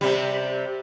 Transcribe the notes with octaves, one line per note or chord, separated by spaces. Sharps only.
C3 G3